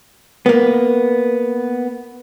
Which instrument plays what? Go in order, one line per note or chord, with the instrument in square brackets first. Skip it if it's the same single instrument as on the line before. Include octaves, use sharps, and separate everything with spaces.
[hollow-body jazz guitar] A#3 B3